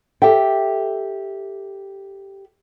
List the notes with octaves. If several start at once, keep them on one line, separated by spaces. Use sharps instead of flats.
G4 A4 E5 G5